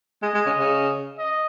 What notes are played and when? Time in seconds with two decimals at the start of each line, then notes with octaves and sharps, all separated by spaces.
0.22 G#3 D#5
0.35 G#3
0.46 C#3
0.58 C#3
1.18 D#5